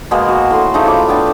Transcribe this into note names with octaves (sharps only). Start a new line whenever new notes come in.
B2 G#3 A#3 B3
F#4
A2 C6
C#3 A3 D#4 C5
F4 B5 D6
B3 D4 G5 A5